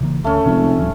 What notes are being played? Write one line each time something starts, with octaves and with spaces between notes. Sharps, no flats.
C#3 E3 A#3
D2 A3 C#4
F1 C3 F3 G#3
D1 F3 G3